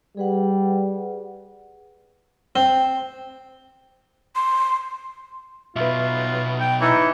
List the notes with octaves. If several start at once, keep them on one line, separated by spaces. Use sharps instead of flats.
G3 G#4 B4 F#5
C4
C6
B1 B2 F4 B4 E5
G5
E3 D#4 C#5